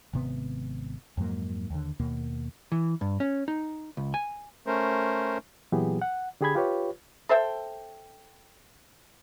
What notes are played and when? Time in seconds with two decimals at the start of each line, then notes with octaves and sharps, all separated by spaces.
0.13 G#1 C3 B3
1.17 F2 G#2 F#3 A#3
1.70 D#2 D3
2.00 D#2 B2 A#3
2.72 E3
3.01 G2
3.20 C#4
3.48 D#4
3.97 C#2
4.14 G#5
4.67 A3 C#4 A#4 C5
5.72 A#2 E3 F#3 B3 G4 G#4
6.02 F#5
6.41 D3 G4 G#4 G#5 B5 G#6
6.55 F4 G4 B4 C#5
7.29 A4 C5 E5 G5